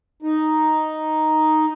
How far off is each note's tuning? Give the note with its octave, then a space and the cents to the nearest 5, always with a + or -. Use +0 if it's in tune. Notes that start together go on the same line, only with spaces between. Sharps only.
D#4 +0